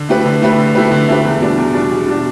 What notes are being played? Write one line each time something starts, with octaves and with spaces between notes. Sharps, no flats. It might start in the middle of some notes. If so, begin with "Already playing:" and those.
Already playing: D3
A3 E4 G4 B4
D3
A3 E4 G4 B4
D3
A3 E4 G4 B4
D3
A3 E4 G4 B4
E2
B2 G3 D4
E2
B2 G3 D4
E2
B2 G3 D4